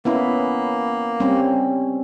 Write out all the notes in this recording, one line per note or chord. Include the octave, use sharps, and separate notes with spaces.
A#3 B3 C#4 E4
G3 C4 C#4